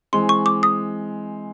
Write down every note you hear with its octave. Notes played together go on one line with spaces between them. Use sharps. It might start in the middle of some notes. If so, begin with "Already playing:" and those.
E3 G#3 C4 C6
C#6
D6
D#6